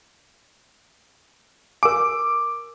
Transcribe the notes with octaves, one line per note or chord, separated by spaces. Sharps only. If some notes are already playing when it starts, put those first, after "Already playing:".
A#4 G#5 D6